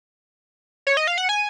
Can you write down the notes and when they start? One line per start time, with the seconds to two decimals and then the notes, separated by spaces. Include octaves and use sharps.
0.87 C#5
0.97 D#5
1.07 F5
1.18 F#5
1.29 G#5